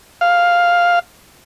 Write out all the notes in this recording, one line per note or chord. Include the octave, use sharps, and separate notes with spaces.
F5